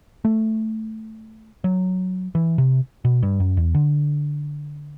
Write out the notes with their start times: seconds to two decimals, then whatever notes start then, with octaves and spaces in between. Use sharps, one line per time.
0.25 A3
1.64 F#3
2.35 E3
2.58 C3
3.05 B2
3.23 G2
3.40 F#2
3.57 E2
3.75 D3